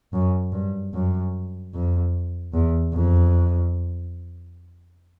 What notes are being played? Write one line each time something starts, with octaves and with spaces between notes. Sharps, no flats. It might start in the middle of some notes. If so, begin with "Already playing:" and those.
F#2
G2
F#2
F2
E2
F2